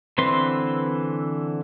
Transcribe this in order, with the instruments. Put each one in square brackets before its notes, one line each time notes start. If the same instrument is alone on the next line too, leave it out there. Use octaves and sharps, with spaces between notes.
[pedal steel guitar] D3 E3 C4 B4 C6